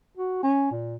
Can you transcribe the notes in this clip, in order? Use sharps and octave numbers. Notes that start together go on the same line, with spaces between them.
F#4
C#4
A#2